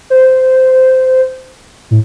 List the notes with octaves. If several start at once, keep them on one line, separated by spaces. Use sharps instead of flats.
C5
A2